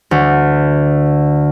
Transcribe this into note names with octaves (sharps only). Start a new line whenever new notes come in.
D2